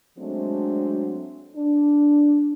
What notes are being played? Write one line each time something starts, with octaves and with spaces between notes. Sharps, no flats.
F#3 G#3 A3 C4 D4
D4